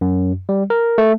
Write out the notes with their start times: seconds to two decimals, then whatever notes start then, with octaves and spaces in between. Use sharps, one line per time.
0.01 F#2
0.49 G3
0.70 A#4
0.98 A3